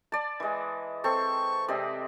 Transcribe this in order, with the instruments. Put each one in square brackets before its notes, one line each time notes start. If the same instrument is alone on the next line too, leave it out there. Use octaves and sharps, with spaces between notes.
[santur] D5 A5
[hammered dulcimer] E3 G#3
[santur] C4 A4 [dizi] C#6
[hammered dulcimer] C3 G#3 C4 [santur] D5